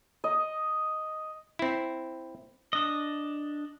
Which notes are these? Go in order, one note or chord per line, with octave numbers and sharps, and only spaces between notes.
D#5
C4 E4
D4 D#5